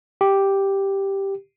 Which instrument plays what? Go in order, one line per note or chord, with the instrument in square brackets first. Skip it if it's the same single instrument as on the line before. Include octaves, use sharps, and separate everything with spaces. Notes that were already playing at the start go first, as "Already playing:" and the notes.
[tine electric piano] G4